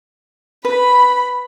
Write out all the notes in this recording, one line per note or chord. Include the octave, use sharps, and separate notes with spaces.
B4 B5